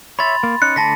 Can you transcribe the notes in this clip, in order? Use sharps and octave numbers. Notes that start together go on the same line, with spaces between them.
C#5 E5 B5 C6 A6
A#3
C#4 D#4 F#6 C#7
D3 A3 D5 A5 A#6 B6